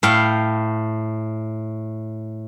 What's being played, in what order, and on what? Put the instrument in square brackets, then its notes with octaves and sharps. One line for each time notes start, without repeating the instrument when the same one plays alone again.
[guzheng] A2 F5 G5